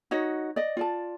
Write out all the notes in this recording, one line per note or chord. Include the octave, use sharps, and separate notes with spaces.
D#4 F#4 C#5 D#5
D5 D#5
F4 D5 A5